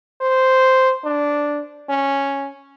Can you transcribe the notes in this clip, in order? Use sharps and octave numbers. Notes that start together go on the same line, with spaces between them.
C5
D4
C#4